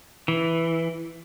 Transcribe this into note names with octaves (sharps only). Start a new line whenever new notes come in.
E3